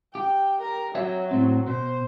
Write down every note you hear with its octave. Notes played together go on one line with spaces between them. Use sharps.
G4 G5
A#4
F#3 F#4 C#5 E5
A2 C4
B2 C5